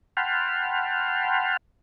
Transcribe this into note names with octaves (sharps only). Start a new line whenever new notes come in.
F#5 G5 A5 B5 C6 F6